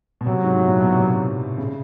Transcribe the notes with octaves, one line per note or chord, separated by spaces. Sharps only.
B2
C3 F#3
G#2
A2
A#2
B2
C3
C#3